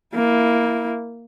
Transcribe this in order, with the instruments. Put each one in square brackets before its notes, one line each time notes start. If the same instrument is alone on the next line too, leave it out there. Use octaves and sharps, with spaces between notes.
[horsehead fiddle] A#3 E4